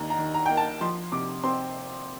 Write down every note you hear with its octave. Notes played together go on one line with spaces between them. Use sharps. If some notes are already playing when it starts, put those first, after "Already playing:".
Already playing: D#2 D#3 A#5
A#5
D#3
A#5
A#3 G5
A5
F3 C6
C3 D6
C4 C6